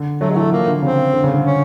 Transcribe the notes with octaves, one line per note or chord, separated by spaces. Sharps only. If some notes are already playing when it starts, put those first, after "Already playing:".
Already playing: D3
F#3 A3
G#3
E3 A3
F3 A#3
D3
C#3 C4
D3
C#3
D3
C#4